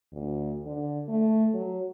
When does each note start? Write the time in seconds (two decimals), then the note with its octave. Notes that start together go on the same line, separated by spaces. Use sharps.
0.12 D2
0.66 D3
1.08 A3
1.54 F#3